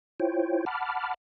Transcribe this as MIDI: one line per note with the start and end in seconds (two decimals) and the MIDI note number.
0.20 0.65 64
0.20 0.65 65
0.20 0.65 72
0.20 0.65 73
0.20 0.65 79
0.66 1.14 78
0.66 1.14 81
0.66 1.14 83
0.66 1.14 86
0.66 1.14 89